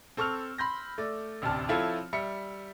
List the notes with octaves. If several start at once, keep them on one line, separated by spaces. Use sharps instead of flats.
C4 A4 C#6 E6 F6 F7
B5 C6 G6 A#6
A3 D5
A1 D2 C3 D5 A5 F6
F3 C4 E4 F4 A4 C#5
G3 E5 C#7